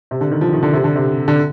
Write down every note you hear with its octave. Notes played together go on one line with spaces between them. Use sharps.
C3
D3
D#3
F3
D#3
D3
C3
D3
C3
D3